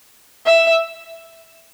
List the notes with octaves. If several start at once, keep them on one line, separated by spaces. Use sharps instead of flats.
E5